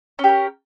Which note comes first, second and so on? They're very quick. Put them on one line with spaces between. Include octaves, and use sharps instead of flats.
C#4 G4 A#4